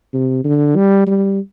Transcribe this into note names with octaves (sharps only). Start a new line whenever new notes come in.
C3
D3
G3
G3